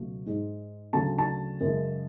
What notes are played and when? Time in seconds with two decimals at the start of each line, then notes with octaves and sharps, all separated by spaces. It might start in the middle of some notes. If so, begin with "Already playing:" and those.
Already playing: C#2 B2 F#3 A3
0.26 G#2 G#3
0.93 D2 C#3 F#3 A3 A5
1.18 A5
1.60 F#2 C#3 G#3